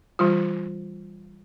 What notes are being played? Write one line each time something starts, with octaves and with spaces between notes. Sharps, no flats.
E3 G3 F4